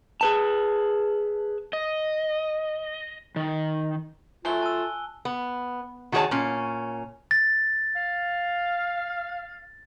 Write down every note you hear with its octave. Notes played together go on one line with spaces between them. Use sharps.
G#4 B4 A5
D#5
D#3
F#3 A3 F4 G#5 F#6 G7
A5 E6
B3
D#3 F#4 G#4 A4 C#5 A5
A#2 C#4
A6
F5